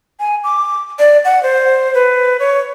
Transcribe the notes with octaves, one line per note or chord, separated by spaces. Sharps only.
G#5
D6
D5
F#5
C5
B4
C#5